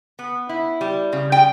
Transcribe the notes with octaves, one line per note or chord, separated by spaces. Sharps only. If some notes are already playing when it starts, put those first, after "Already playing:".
B3
E4
G3
C#3
G5